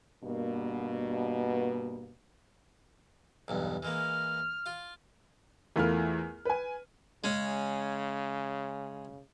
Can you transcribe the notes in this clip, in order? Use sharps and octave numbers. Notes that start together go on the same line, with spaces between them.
G2 B2 A#3
B1 E2 G2
E3 G#3 A#3 F6
F4 F5
E2 A3 E4 F4 A#4 F6
B4 G#5
C#3 G#3 C#4